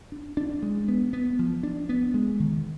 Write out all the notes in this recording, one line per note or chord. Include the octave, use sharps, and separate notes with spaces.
D4
D4
G#3
B3
B3
F3
D4
B3
G#3
D#3